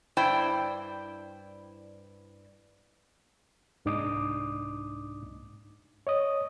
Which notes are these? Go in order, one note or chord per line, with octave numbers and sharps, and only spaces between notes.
G2 E4 C5 D5 G5
C2 G#2 D4 D#4 D6 D#6
C#5 D#5 D#6